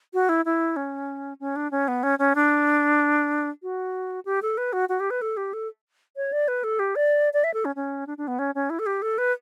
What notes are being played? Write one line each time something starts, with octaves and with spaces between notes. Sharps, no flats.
F#4
E4
E4
C#4
C#4
D4
C#4
B3
C#4
C#4
D4
F#4
G4
A4
B4
F#4
F#4
G4
B4
A4
G4
A4
C#5
D5
B4
A4
G4
D5
D5
E5
A4
C#4
C#4
D4
D4
B3
C#4
C#4
E4
A4
G4
A4
B4